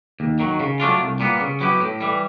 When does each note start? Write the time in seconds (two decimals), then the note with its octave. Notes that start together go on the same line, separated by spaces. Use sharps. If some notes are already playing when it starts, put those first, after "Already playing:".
0.20 D#2
0.40 D#3 F#3
0.60 C#3
0.80 F#3 A3 D4 F4
1.00 C2
1.20 A#2 G3 B3
1.40 C#3
1.61 F#3 B3 E4 G4
1.80 A2
2.00 E3 G3